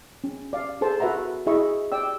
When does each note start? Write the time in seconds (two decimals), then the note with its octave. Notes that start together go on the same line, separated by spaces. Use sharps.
0.24 C#4
0.53 D5 F5
0.81 G#4 A4 C5 A5
1.00 F#4 B4 E5 F#5 A#5
1.47 E4 G#4 D#5 E5 B5 C#6
1.92 D5 G5 E6